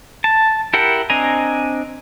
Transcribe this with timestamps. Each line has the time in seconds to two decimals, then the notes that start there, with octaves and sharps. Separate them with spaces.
0.24 A5
0.74 E4 G4 A#4 F#5
1.10 C4 D4 D#5 G#5 A#5